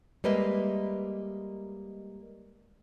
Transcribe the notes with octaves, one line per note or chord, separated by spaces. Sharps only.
G3 G#3 A#3 B4 D#5 E5